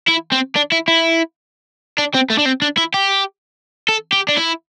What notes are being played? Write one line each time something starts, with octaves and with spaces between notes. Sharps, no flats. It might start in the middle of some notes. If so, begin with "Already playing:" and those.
E4
C4
D4
E4
E4
D4
C4
A3
D4
C4
D4
E4
G4
A4
G4
D4
E4